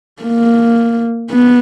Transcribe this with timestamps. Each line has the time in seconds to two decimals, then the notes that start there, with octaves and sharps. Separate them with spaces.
0.22 A#3
1.31 B3